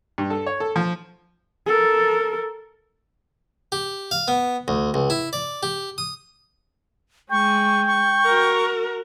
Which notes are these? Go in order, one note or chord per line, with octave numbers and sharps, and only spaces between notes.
G2
A4
C#5
A4
F3
A4 A#4
G4
F5
B3
D2
C#2
E4
D5
G4
D#6
G#3 G5 C#6
C#6
F#4 A#4